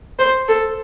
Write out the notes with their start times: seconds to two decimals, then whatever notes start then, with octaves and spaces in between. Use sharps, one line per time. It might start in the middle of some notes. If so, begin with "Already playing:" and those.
0.19 C5
0.49 A4